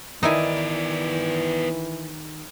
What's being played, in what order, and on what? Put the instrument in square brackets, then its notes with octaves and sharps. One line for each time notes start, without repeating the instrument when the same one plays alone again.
[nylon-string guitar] D#3 [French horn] E3 [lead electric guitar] B3 D5 [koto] D#4 E4 G#5